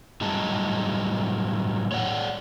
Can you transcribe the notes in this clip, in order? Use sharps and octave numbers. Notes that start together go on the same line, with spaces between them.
A2 F#3 G3 D#4 G#4 A5
C#5 D5 F#5